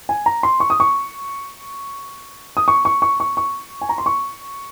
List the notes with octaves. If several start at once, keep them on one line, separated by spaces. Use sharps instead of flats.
G#5
A#5
C6
C#6
D#6
C#6
D#6
C#6
C#6
C#6
C#6
C#6
G#5
A#5
C6
C#6